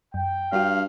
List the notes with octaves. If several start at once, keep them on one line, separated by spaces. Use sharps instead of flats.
F#2 G5
G2 D4 F#4 F5